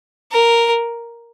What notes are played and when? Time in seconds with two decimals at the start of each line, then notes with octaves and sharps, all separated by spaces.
0.32 A#4